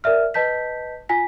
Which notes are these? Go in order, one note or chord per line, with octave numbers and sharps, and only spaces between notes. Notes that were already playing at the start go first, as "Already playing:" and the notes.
A#4 D5 E5 F6
B4 D#5 A5 G6 B6
F4 G#5 B6